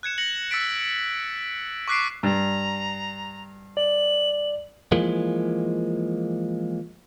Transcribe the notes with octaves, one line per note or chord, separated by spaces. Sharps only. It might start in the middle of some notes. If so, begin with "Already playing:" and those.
F#6 G#6 C#7 E7
A#6 C#7 F#7
E6 A6 B6 D7
C#6 D6 F#6 B6 C7 D7
G2 A#5
D5 F#7
E3 F3 G#3 A#3